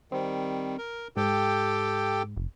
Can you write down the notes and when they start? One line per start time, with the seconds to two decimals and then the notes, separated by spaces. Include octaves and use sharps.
0.12 D#3 G3 C4
0.78 A#4
1.17 G#2 G4 A4 G5
2.36 F#1